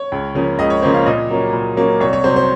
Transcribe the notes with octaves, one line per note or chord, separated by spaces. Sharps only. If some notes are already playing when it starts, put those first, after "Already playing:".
Already playing: C#5
C#2
C#3 F3 A#3 C#4
C#2 D#5
C#5
C#3 F3 A#3 C#4 C5
F5
A#2 D#5
F#3 A#3 C#4
A#2
F#3 A#3 C#4
C2 C#5
C#5
C3 F#3 C4 C5
C5